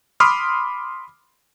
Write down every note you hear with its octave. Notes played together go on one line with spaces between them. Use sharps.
B5 C6 D6 D#6 F6